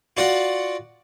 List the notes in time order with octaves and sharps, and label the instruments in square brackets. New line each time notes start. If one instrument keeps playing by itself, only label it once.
[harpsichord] F4 F#4 D5 F#5